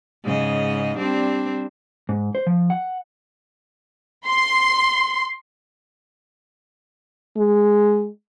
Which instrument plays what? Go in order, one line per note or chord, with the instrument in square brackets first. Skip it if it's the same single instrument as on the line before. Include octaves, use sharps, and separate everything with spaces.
[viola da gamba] G#2 C#3 D#5
G3 C4 D4
[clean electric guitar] G#2
C5
F3
F#5
[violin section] C6
[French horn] G#3